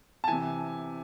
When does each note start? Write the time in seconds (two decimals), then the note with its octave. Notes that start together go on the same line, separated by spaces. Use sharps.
0.24 A5
0.28 C3 E3 G#5